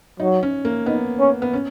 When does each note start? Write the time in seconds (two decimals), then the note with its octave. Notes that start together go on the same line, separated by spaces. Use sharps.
0.20 F#3 D#4
0.43 C#4
0.65 A#3
0.86 B3 D#4
1.19 C#4
1.42 B3
1.53 C#4